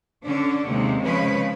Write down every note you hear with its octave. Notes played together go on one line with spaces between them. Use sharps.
D3 C#4 D4
D#2 C3 G#3
C#3 F3 G#3 B4